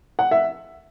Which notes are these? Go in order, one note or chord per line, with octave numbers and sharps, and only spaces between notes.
F#5
E5